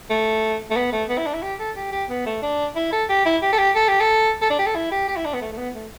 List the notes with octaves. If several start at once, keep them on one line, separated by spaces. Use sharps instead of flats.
A3
A3
B3
A3
B3
E4
D4
E4
G4
A4
G4
G4
B3
A3
D4
E4
A4
G4
E4
G4
A4
G4
A4
G4
A4
A4
D4
G4
A4
E4
G4
G4
E4
D4
B3
A3
A3
B3
A3